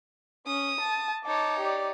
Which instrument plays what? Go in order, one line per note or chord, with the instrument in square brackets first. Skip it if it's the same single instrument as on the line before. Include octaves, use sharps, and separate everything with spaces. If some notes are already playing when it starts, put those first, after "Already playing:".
[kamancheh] C#4 [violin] D#6
[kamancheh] A5
[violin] D#4 C#5 [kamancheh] A5 D6
[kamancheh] G4 D5